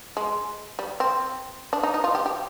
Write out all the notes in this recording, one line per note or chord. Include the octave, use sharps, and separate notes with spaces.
G#3
G3
C4
D4
D#4
D#4
F4
G4
G4